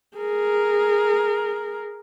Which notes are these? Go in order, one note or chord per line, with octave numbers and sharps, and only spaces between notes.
G#4 A#4